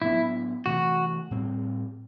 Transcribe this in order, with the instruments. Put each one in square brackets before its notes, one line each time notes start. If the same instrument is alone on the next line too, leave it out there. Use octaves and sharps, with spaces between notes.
[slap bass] A2 F#3 B3 D4 [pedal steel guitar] E4
[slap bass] C3 E3 A3 [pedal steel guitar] F#4
[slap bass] A2 G3 C4